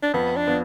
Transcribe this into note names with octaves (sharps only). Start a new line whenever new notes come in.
D4
F2 B3
D4
F3 B3